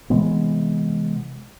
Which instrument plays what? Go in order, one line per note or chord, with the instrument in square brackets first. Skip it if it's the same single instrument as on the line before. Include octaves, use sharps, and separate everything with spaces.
[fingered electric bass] C3 E3 G#3 B3